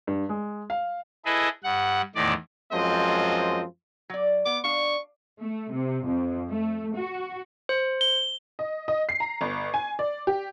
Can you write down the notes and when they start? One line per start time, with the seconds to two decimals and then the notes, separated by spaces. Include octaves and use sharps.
0.07 G2
0.29 G#3
0.70 F5
1.25 E4 G#4 A4 B4 D#5
1.63 G2 F#5
2.15 E2 A2 D#3 D5
2.73 F#2 F3 G#3 C4 D#5
4.10 F#3 D5
4.46 B3 D6
4.64 D4 F5 C#6
5.41 A3
5.73 C3
6.06 F2
6.50 A3
6.97 F#4
7.69 C5
8.01 G7
8.59 D#5
8.88 D#5
9.09 C7
9.20 A#5
9.41 G1
9.74 G#5
9.99 D5
10.27 G4